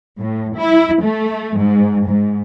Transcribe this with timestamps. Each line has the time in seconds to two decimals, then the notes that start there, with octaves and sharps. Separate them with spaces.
0.18 A2
0.57 E4
1.03 A3
1.57 G#2
2.06 G#2